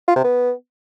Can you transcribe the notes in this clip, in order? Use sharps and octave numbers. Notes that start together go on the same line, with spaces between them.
F4
C3
B3